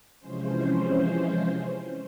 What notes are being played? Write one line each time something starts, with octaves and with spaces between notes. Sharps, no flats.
C3 E3 F3 G#3 C#4 C5